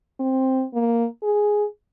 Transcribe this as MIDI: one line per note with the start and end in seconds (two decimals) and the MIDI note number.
0.20 0.64 60
0.74 1.06 58
1.23 1.64 68